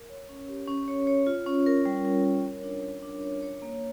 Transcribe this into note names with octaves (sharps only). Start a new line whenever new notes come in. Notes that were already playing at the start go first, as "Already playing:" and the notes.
Already playing: A#4
C#5
C#4
G4
C#4
C#5
C#5
F4
C#4
A#4
G3
A#4
A#4
C#5
D4
C#5
D4
C#5
C#5
A#3